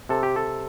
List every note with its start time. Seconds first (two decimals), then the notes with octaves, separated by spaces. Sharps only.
0.09 C3 A4
0.23 G4
0.36 A4